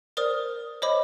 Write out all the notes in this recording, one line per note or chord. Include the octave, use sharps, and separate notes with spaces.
A#4 C5 D5 D#6 F6
C5 C#5 D#5 B5 D6